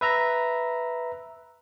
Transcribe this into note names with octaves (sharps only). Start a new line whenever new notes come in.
B4 E5 A#5